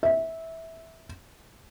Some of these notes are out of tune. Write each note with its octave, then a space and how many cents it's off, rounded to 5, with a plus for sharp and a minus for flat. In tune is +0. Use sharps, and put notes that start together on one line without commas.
E5 -15